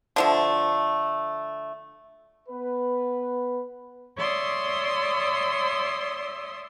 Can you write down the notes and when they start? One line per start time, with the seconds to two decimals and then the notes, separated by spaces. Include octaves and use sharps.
0.16 D3 F3 A3
2.49 B3 B4
4.17 C#5 D5 E5 C6 D#6